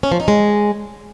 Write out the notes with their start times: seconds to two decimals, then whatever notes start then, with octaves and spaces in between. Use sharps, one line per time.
0.03 C#4
0.12 F3
0.20 D#4
0.28 G#3